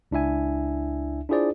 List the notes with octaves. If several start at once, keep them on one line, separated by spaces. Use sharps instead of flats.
C#2 D4 E4 E5 G#5
D4 E4 F4 G#4 C5 D5